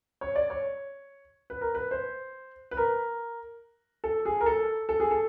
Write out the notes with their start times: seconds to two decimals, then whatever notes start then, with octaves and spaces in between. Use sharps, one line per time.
0.21 C#5
0.36 D5
0.50 C#5
1.50 B4
1.61 A#4
1.75 B4
1.91 C5
2.71 B4
2.77 A#4
4.04 A4
4.25 G#4
4.41 A#4
4.46 A4
4.89 A4
5.00 G#4
5.11 A4